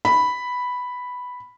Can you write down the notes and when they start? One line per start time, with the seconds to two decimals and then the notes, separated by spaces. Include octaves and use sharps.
0.05 B5